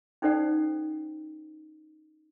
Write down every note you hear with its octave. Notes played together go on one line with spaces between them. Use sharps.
C#4 D#4 A4 C5 D5 F#5